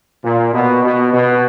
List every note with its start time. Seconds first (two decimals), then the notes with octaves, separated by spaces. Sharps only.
0.24 A#2
0.54 B2
0.84 B2
1.13 B2